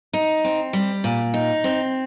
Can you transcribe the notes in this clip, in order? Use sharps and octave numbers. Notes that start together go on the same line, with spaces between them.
D#4
C4
G3
A#2
D#4
C4